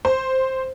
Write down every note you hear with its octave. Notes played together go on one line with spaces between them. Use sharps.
C5